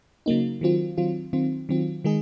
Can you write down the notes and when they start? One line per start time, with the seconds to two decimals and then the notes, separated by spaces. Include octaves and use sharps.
0.26 C#3 F#3 A#3 D#4
0.61 D#3 F#3 C4 F4
0.98 D#3 F#3 C4 F4
1.33 D#3 F#3 C4 F4
1.69 D#3 F#3 C4 F4
2.04 D#3 G#3 D#4 G#4